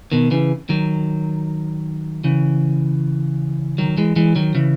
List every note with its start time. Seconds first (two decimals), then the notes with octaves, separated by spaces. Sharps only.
0.12 B2 D#3
0.31 C#3 E3
0.69 D#3 F#3
2.24 C#3 E3
3.78 D#3 F#3
3.97 E3 G#3
4.16 E3 G#3
4.36 D#3 F#3
4.55 C#3 E3